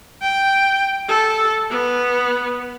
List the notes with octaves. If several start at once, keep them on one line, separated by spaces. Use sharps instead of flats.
G5
A4
B3